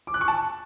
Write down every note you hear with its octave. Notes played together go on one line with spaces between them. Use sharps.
D6
F#6
C#6
A5